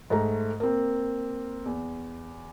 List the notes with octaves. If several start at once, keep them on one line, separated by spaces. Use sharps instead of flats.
G#2 A3 A#5
A#3 C4
E2